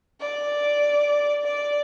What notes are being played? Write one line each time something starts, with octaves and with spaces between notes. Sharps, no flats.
D5
D5